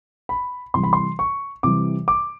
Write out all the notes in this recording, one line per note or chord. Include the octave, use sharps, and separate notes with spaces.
B5
C3 E3 G3 C6
B5
C6
C#6
C3 E3 G3 D6
D6